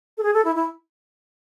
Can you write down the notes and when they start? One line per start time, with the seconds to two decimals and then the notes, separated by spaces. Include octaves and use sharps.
0.18 A4
0.23 G#4
0.34 A4
0.45 E4
0.55 E4